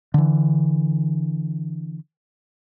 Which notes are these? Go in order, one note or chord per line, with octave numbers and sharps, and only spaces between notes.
D3 E3